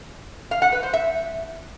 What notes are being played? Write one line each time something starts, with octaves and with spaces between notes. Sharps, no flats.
F5
F#5
B4
C5
E5